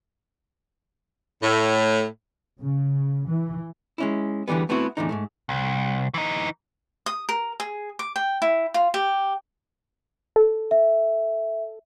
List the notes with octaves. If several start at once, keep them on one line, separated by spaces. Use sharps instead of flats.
A2
C#3
E3
G#3 C#4 E4
E2 D3 E3 G3 B3
A3 B3 C4 E4 F#4
E2 A2 D3 D#4
G#2 B2 A3
C2
E3 D#4
D#6
A#4
G#4
D6
G5
E4
F4
G4
A4
E5